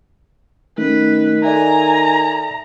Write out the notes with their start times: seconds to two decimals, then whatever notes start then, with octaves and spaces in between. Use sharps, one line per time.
0.78 D#3 A3 C#4 B4
1.44 A4 D5 E5 G#5 A#5